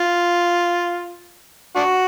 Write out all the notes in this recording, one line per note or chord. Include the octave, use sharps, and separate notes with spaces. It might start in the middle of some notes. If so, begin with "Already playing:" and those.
Already playing: F4
D4 F#4